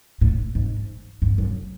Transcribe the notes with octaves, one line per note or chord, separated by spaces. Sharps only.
A2
G#2
G2
F#2